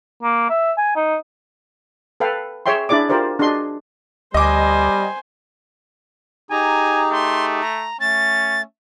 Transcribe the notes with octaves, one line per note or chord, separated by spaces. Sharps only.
A#3
E5
G#5
D#4
A4 B4 F5 G5
G#4 C#5 E5 G5 C6
D4 E4 G#4 D5 D6
F4 G4 A#4 C5 D5
D4 F#4 G#4 D#5 C6
D2 G3 C5 D#5 G#5 D6
D#4 G4 G#4 G#5 A#5
A3 C6
A#5
A3 C#4 A6